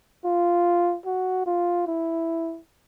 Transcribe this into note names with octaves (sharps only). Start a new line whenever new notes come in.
F4
F#4
F4
E4